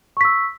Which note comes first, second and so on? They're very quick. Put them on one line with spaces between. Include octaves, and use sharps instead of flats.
C#6 B6 E6